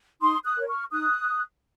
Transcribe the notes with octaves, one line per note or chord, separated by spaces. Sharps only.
D#4 C6 D#6
D#6 F#6
A#4 C#5
C#6 F6
D#4 D#6 F#6